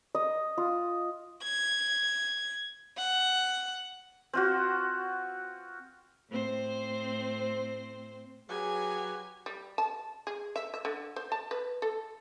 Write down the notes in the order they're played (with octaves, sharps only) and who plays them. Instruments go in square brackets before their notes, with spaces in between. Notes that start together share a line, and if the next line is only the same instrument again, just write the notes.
[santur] D#5
F4
[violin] G#6
F#5
[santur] C4 F4 F#4
[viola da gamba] A2 C4 C5
[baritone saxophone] F#3 [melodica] G4 B4 C#5 [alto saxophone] G#4 [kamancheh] G#5
[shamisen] G3
A5
G#4
E5
E5
D3
C5
A5
B4
A4